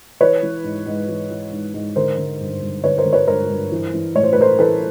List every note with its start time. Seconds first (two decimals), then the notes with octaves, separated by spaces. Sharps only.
0.21 E3 B4 C#5
0.43 E3
0.64 G#2
0.86 G#2
1.09 E3
1.30 E3
1.52 G#2
1.74 G#2
1.96 D3 A#4 C5
2.18 D3
2.41 G2
2.63 G2
2.84 D3 B4 C#5
2.98 A#4 C5
3.05 D3
3.13 B4 C#5
3.27 G2 A#4 C5
3.50 G2
3.72 E3
3.94 E3
4.15 A2 C#5
4.24 C5
4.33 B4
4.37 A2 A#4 C5
4.59 E3 A4 B4